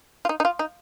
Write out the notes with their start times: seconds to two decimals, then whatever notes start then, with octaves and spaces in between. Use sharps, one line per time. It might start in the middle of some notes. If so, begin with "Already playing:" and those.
0.25 F4
0.29 D#4
0.40 D#4
0.45 F4
0.59 D#4